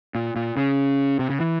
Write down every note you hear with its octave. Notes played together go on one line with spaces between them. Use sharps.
A#2
A#2
C#3
C3
C#3
E3